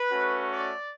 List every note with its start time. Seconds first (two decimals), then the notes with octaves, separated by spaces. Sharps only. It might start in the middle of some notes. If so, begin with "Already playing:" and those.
Already playing: B4
0.10 A3 C#4 F#4
0.50 D5